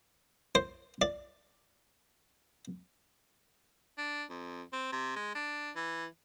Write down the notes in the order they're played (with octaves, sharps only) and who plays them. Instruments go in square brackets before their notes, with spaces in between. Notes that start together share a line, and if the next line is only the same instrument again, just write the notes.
[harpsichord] C5
D5
[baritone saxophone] D4
F2
C4
C3
G#3
D4
E3